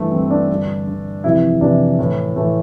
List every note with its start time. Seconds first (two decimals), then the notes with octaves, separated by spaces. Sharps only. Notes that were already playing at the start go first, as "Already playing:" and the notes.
Already playing: G2 E3 A3
0.11 G2 E3 C4
0.30 D4
0.50 G2 D3
0.86 G2 D3
1.24 F2 C3 E3 E4
1.61 F2 C3 E3 D4
1.99 A2 E3
2.36 A2 E3 A3